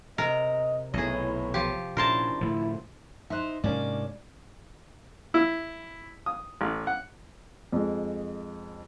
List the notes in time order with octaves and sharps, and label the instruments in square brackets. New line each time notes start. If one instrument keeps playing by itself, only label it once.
[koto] C3 A#4 A#5 [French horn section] D#5
[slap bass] B1 [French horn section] A2 E4 C#5 [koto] G#4 D#5
[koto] F3 G4
[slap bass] A#2 [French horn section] C#4 D4 E4 [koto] A#4 C5 A5
[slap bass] A2 D3 F3 [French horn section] E4
[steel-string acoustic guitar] D#4 C5 [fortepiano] E5 C6 F#6
[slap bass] G#2 C3 G#3 [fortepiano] A#3 C#4 [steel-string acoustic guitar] D4 D5
[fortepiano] E4
D#6
A1
F#5
[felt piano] F2 G#3